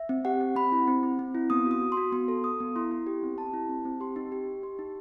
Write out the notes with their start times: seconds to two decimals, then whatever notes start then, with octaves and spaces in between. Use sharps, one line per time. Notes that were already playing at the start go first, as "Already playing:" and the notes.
Already playing: E5
0.09 C4
0.25 G4 F#5
0.41 C4
0.56 C4 B5
0.72 E4
0.88 C4
1.03 C4
1.19 C4
1.35 E4
1.50 B3 D#6
1.66 F#4
1.71 D#6
1.82 F#4
1.92 C6
1.97 F#4
2.12 B3 C6
2.28 A4
2.44 A4 D#6
2.60 B3
2.76 E4 C6
2.91 E4
3.07 G4
3.23 C4
3.38 G4 A5
3.54 E4
3.69 C4
3.85 C4
4.00 G4 C6
4.16 D#4
4.32 G4
4.48 D#4
4.63 G4 C6
4.79 D#4